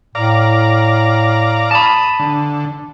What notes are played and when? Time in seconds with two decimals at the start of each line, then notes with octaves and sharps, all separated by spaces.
0.15 A2 D5 F5 A#5
1.71 A5 B5 D#6
2.19 D3